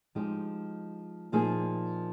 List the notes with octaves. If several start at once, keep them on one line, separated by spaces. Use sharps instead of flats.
F3 G#3 D#4 G4
A#2 F3 A#3 D#4 G#4